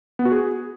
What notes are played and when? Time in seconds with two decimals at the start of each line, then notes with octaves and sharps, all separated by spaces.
0.19 B3
0.25 F#4
0.32 G#4